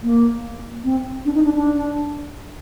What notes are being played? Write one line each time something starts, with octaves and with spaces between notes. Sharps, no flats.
A#3
C4
D4
D#4
D4
D4